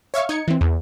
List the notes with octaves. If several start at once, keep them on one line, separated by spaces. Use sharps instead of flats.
C#5 E5 F5 C#6
D#4 G#6 C#7
E3 C4
E2